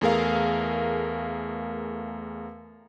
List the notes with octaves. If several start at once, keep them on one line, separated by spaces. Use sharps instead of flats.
E2 A3 G#4 A#4 F5